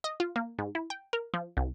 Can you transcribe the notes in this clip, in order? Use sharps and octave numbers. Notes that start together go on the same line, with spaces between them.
D#5
F4
A#3
G#2
E4
G5
A#4
F3
C2